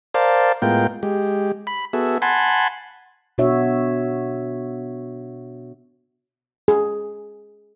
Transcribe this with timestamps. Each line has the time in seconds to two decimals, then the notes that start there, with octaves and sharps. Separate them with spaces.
0.14 A#4 C5 D5 F5 A5
0.62 A2 G#3 B3 F4 A#4 G5
1.03 G#3 G4
1.67 B5
1.93 B3 F#4 G#4 A4 E5
2.22 F#5 G#5 A5 B5 C6
3.38 B2 D4 F#4 C#5 E5
6.68 G#4